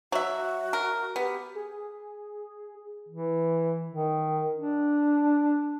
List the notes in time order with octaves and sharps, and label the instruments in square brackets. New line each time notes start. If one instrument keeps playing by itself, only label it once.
[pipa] F#3 E5 [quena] F#4
[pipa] A#4
[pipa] B3 [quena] G4
[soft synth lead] G#4
[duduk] E3
D#3
D4